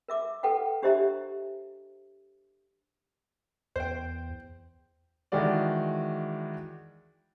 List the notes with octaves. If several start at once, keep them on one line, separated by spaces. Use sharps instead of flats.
A#4 E5 D6
A4 B4 F#5 G5
D4 G4 C5 D#5 E5 A#5
E2 C5 G5
D#3 E3 G#3 F#4 D5